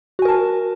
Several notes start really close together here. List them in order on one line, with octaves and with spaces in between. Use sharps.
F#4 G#5 A#4 A5